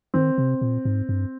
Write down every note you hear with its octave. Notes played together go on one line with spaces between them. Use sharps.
D#3 C4
C3
A#2
G#2
G2